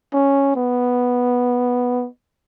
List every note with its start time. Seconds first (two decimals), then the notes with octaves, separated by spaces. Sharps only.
0.13 C#4
0.55 B3